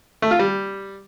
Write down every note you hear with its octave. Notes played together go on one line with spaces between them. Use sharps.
A3
F4
G3